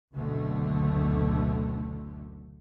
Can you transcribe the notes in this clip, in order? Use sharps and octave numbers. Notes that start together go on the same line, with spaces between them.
F#1 D2 B2 D3 A3